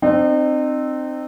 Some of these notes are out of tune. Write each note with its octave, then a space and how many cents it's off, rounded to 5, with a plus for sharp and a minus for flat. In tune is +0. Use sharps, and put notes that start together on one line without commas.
C4 +0 D#4 -40